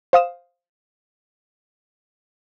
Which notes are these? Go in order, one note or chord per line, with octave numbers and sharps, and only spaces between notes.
C5 F5 D#6 E7